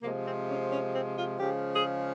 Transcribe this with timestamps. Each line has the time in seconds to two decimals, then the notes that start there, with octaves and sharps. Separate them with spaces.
0.02 C3 F3 G#3 A#3
0.25 C4
0.49 C#4
0.71 C#4
0.94 C4
1.17 F4
1.39 C#3 F3 G#3 G4
1.74 G#4